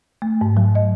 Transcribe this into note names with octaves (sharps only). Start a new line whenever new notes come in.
A3
G#2
F#3
D#5